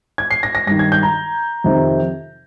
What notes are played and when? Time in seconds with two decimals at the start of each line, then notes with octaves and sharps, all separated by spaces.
0.18 G#6
0.30 C7
0.43 A#6
0.55 A#6
0.67 G2 A#6
0.71 D#3
0.79 G#6
0.92 G6
1.03 A#5
1.64 F2 C3 D#3